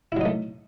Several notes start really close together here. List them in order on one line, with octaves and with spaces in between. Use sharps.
E4 F#3 D#4 A3